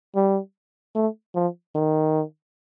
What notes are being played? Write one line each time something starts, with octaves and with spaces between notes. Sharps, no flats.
G3
A3
F3
D#3